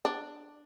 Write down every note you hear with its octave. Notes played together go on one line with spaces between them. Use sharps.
D4